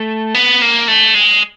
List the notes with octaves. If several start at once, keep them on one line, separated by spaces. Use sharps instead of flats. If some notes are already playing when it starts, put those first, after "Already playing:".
Already playing: A3
B3
A#3
A3
G#3